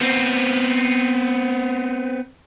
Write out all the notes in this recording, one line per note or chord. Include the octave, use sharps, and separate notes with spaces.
B3 C4